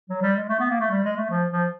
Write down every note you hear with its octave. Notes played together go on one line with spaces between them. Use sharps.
F#3
G3
G#3
A3
B3
A#3
A3
G3
G#3
A3
F3
F3